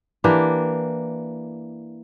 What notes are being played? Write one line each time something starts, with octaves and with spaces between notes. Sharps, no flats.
E3 A#3 D4 G4